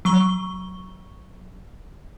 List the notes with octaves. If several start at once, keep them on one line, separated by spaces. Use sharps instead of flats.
F#3 C#6 G7